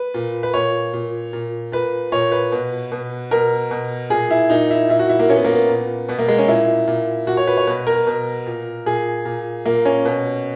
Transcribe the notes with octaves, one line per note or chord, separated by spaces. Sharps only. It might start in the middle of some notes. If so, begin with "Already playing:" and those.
Already playing: B4
A#2
B4
A#2 C#5
A#2
A#2
A#2 B4
A#2 C#5
B4
B2
B2
B2 A#4
B2
A#2 G#4
E4
A#2 D#4
E4
A#2 E4
F#4
E4
A#3
A#2 C#4
B3
A#3
B3
A#2
B2 B3
A#3
G#3
C#4
A#2 E4
A#2
A#2 F#4
C#5
B4
C#5
B2 B4
A#4
B2
A#2
A#2 G#4
A#2
A#2 A#3
C#4
B2